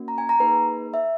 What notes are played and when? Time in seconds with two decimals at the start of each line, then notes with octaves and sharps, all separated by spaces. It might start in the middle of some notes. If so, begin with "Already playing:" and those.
Already playing: A#3 C#4 F#4
0.08 A#5
0.18 G#5
0.29 A#5
0.40 A#3 D#4 G#4 B4
0.94 E5